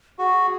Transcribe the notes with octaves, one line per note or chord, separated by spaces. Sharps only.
F#4 G#4